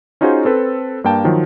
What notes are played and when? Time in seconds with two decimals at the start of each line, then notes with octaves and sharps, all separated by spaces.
0.21 C#4 D#4 F4 F#4 G#4 C5
0.45 C4 A4 B4
1.04 G2 A#3 G5 A5
1.24 D#3 F3 F#3